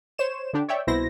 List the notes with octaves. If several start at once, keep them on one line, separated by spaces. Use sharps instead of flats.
C5 C#5 E7
D3 D4 G4
C#5 D5 E5 G5
C2 B2 E4 C5 A#6